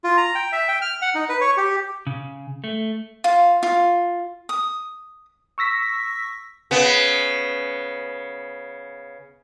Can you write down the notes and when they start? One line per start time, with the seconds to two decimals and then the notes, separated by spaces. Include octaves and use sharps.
0.04 F4
0.17 A#5
0.35 G5
0.52 E5
0.68 G5
0.82 F6
1.02 F#5
1.15 D#4
1.29 B4
1.41 C#5
1.57 G4
2.07 C#3
2.64 A3
3.24 F4
3.63 F4
4.49 D#6
5.58 C#6 E6 A#6 B6
6.71 C#3 B3